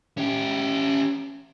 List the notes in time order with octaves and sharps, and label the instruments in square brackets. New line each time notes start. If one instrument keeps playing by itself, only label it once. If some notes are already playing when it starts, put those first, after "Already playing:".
[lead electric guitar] C#4 G4